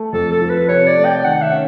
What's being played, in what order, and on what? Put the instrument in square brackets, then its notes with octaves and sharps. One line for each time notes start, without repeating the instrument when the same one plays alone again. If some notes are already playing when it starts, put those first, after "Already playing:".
Already playing: [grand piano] A3
[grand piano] F2 [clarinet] A4
[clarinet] A4
[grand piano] F3
[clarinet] B4
[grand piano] C3 [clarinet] C#5
[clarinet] D5
[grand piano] A3
[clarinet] G5
[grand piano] D#3 [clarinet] F#5
[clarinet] E5
[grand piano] C#4